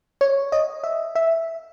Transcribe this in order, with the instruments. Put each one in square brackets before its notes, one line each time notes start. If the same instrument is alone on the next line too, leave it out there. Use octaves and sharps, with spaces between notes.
[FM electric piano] C#5
D#5
E5
E5